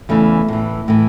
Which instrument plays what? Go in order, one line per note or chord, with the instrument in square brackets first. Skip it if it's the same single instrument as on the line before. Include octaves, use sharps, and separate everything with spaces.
[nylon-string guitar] E2 C#3 E3 A3
A2 E3
A2 E3